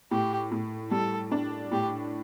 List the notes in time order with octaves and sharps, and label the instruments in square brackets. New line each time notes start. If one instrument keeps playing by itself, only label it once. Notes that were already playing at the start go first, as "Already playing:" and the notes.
[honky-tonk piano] A2 [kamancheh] G4
[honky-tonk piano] A2
[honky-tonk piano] G3 [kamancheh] A4
[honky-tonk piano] D4
[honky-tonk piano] A2 [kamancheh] G4